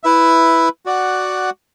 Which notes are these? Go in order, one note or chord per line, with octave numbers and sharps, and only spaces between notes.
E4 B4 E5
F#4 D5 F#5